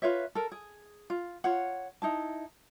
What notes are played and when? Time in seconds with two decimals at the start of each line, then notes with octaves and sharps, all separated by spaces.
0.02 F4 B4 C#5 E5
0.35 A4 A#4
0.52 G#4
1.10 F4
1.44 F4 C#5 F#5
2.02 D#4 E4 A5